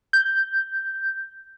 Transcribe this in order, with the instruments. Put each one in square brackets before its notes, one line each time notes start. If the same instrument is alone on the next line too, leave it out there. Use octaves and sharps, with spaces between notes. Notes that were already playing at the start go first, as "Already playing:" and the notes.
[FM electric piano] G6